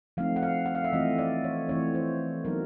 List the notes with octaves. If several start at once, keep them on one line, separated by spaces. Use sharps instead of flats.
F3 A3 C4 D#4 F5
F#5
F5
F#5
F5
E5
E3 A3 C4 F4 D#5
D5
C#5
E3 A3 C4 E4 C#5
C5
F#3 B3 D#4 A#4